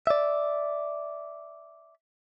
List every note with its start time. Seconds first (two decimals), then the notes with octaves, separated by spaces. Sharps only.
0.07 D5 E5